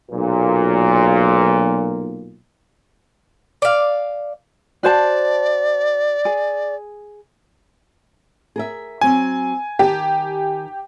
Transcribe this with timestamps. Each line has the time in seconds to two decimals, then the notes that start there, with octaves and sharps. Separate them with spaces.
0.11 B1 A#2
3.62 D5 F5
4.83 F#4 C5 D5 A5
6.25 G#4
8.56 G#4 A#4 E5
9.01 F#3 C4 G#5
9.79 D#3 G4 A5